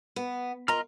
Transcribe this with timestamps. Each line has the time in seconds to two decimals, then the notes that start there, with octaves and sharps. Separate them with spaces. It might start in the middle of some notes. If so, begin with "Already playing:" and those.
0.16 B3
0.68 F4 A#4 D#5 A#5 F6